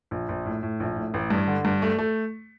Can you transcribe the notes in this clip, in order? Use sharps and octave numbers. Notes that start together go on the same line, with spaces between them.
A#1
A#1
A2
A2
A#1
A2
A1
G2
D3
G2
A3
A3